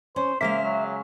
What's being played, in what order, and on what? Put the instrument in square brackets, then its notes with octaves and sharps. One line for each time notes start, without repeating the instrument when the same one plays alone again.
[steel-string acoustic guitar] C#4 [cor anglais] C5
[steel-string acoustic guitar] C#3 G#3 F5 [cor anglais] A#3 [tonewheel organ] E5
[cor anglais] F#3